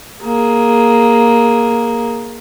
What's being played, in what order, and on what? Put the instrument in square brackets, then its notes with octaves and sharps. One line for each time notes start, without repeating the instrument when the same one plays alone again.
[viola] A#3 G#4